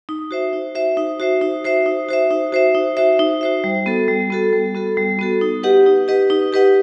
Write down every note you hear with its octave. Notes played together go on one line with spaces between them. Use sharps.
D#4
F#4 C5 E5
D#4
F#4 C5 E5
D#4
F#4 C5 E5
D#4
F#4 C5 E5
D#4
F#4 C5 E5
D#4
F#4 C5 E5
D#4
F#4 C5 E5
D#4
F#4 C5 E5
G3
B3 F#4 A4
G3
B3 F#4 A4
G3
B3 F#4 A4
G3
B3 F#4 A4
D#4
G4 B4 D#5 F#5
D#4
G4 B4 D#5 F#5
D#4
G4 B4 D#5 F#5